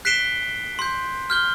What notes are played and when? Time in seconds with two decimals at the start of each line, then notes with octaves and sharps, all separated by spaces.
0.05 F#6 B6 C7 D7 E7 G7
0.79 C6 G6
1.30 F6 G6 G7